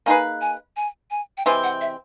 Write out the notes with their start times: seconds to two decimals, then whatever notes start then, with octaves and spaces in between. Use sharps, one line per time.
0.06 A#3 D#4 G#4 B4 G#5
0.41 G#5
0.76 G#5
1.11 G#5
1.37 G5
1.46 C3 E3 G#3 C4 G#5
1.63 F#5
1.81 E5